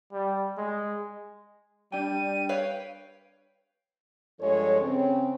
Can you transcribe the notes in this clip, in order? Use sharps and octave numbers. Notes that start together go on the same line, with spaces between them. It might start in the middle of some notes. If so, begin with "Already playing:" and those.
G3
G#3
G3 D4 G5 D#7
B4 C#5 F5 G5
G2 F3 G#3 A4 C#5
C#3 C4 C#4